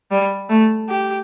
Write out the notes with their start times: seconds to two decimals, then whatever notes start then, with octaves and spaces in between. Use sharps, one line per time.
0.11 G3
0.49 A3
0.89 G4